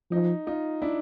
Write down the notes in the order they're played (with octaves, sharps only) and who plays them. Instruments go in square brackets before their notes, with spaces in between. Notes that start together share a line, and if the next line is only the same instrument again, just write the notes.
[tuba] F3 [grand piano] D#4
[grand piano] D#4 F4
D4 E4